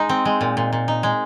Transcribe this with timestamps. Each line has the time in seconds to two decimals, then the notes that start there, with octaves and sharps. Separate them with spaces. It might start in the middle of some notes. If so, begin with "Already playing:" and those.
Already playing: G#3 D#4
0.09 C4
0.25 G#3
0.41 A#2
0.57 A#2
0.73 A#2
0.88 D#4
1.03 G#3